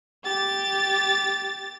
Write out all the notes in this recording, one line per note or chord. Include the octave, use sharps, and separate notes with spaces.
G4 A6